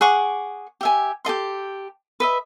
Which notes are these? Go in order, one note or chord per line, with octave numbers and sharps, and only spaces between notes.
G#4 F#5 C#6 D6
G4 E5 G#5
G4 A4 D#5 C6
B4 D#5 E5